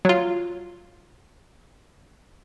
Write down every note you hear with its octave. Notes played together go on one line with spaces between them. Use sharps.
F#3 F4